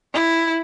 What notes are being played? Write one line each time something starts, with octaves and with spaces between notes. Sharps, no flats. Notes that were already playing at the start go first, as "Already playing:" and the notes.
E4